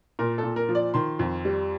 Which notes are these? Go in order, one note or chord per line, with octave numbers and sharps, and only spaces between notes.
A#2 A#4
A4
A#2
A#4
F3
D5
D#3 C6
F2
G3